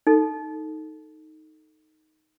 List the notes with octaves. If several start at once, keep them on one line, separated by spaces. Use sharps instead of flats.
D#4 A4